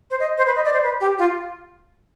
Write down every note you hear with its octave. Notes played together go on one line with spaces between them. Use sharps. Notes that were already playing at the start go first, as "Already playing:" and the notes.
C5
D#5
C5
B4
D#5
D5
C5
B4
G4
F4